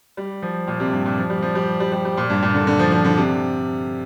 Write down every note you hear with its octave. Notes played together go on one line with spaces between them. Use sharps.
G3
F3
A#2
C3
G2
A#2
F3
G3
F3
G3
G3
G3
G3
A#2
G2
A#2
D3
D3
F3
F3
D3
C3